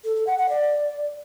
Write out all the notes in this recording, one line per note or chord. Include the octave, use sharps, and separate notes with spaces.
A4
A4
F#5
F#5
D5